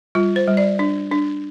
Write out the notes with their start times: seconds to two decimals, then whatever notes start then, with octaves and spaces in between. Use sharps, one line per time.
0.15 G3 F4
0.36 C5
0.47 G3
0.57 D5
0.79 D4
1.11 D4